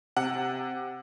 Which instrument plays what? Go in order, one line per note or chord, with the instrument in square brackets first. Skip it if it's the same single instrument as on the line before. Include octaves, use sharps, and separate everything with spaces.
[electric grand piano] C3 [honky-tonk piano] F#5